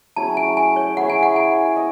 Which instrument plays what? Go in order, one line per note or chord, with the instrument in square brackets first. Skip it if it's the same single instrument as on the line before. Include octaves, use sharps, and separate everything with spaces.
[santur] F#3 C#4 E4 G#4 [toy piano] A5
[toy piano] G#5
G#5
C#5
[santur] E4 G#4 C#5 E5 [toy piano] F#5
[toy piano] G#5
F#5
G#5
[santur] D#5